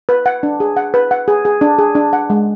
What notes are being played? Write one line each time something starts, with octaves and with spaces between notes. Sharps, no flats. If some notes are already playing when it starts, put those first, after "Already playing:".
B4
F#5
D4
G#4
F#5
B4
F#5
G#4
G#4
D4
G#4
D4
F#5
G#3